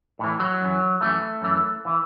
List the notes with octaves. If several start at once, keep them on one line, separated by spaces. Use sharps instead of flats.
A2 E3
F#3
F#2 E3
F#2 E3 A3
F#2 E3
E3